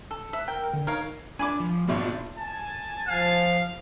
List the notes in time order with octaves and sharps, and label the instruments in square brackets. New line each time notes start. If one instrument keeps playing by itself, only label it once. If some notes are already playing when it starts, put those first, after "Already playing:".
[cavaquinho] A4
[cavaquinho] E5 [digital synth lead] F#6
[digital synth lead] A#4 [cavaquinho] G5
[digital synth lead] D3
[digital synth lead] D#4 [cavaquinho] A#4 C#5 F5
[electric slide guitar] D4 [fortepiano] G#5 B5 D6
[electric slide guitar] F3
[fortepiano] G#1 B2 [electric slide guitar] A#3 G#4
[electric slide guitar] D4 F4
[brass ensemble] G#5 A5
[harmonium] F3 [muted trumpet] F5